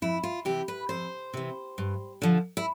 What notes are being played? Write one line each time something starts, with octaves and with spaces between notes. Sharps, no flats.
F2 E4
F4
C3 E3 G4
B4
F2 C5
C3 E3
G2
D3 F3
E4